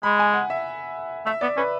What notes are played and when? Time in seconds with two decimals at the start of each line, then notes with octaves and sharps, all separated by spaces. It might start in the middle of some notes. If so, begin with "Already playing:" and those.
0.03 G#3 B5
0.19 G#5
0.34 F#5
0.50 E5
1.26 A3 E5
1.41 B3 D5
1.57 C#4 B4